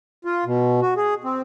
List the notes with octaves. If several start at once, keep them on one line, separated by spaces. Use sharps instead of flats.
F4
B2
F#4
G#4
C4